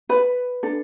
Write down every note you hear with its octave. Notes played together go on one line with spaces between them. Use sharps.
B4 B5
D4 A4